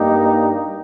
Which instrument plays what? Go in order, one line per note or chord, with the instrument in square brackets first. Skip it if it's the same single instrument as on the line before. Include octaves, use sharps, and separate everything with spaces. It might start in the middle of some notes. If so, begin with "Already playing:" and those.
Already playing: [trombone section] G2 G3 A#3 D#4 G4